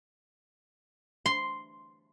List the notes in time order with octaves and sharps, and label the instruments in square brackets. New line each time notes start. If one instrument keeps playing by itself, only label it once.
[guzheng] C6